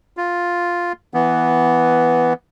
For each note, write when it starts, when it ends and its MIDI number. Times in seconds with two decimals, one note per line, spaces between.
0.17 0.92 65
1.14 2.33 52
1.14 2.33 59